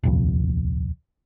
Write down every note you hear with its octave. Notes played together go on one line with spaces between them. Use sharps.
D#1 C2 F2